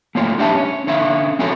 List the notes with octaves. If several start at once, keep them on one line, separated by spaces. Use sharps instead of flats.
A3 A#3 C#4 F4
D4 G4 E5 G#5 A5
C#4 C#5
D3 C#4 E5 F5
C4 C#4 F#4 G#4 A4 C#5